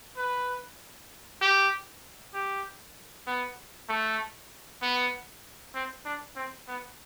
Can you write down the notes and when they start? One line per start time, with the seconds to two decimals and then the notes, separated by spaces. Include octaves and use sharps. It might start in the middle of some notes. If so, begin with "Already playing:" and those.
0.17 B4
1.41 G4
2.34 G4
3.27 B3
3.89 A3
4.82 B3
5.75 C4
6.05 D4
6.36 C4
6.68 B3